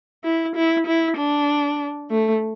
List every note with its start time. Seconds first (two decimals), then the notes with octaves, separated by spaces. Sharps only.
0.24 E4
0.56 E4
0.87 E4
1.17 D4
2.10 A3